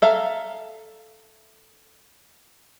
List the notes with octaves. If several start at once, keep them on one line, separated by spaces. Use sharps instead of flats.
A4 E5 F5 A#5